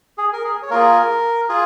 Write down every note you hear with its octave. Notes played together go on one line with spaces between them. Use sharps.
G#4
A#4
G#4
C#5
A#3 F4 G#4 A#4
F4 G#4